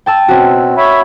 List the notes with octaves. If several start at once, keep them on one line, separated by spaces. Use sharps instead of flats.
G5 A5 E6
B2 C4 C#4 F#4
C#5 E5 B5